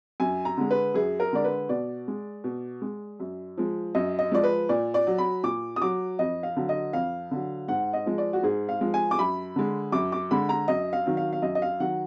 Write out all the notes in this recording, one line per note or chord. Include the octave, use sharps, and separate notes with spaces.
F#2 G#5
A#5
D3 G#3
B4
F#2 G#4
A#4
D3 G#3 D5
B4
B2 D5
G#3
B2
G#3
F#2
F3 G#3
F#2 D#5
D#5
F3 G#3 D5
B4
A#2 D5
D5
F#3
B5
A#2 D6
D#6
F#3 D6
F2 D#5
F5
D3 F#3
D#5
F2 F5
D3 F#3
G#2 F#5
D#5
F3 G#3
D5
F#4
G#2 G#4
F5
F3 G#3
G#5
D6
F#2 B5
D3 G#3
F#2 D6
D6
D3 G#3 B5
A#5
F#2 D#5
F5
D#3 F#3
F5
F5
F#2 D#5
D#5
F5
D#3 F#3 F#5